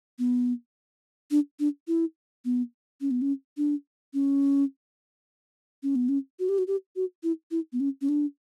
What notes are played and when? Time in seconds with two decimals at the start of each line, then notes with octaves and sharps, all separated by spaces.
0.19 B3
1.31 D4
1.60 D4
1.88 E4
2.45 B3
3.01 C#4
3.11 B3
3.22 C#4
3.57 D4
4.14 C#4
5.83 C#4
5.96 B3
6.09 C#4
6.39 F#4
6.49 G4
6.58 F#4
6.67 G4
6.96 F#4
7.23 E4
7.51 E4
7.73 B3
7.80 C#4
8.01 C#4
8.09 D4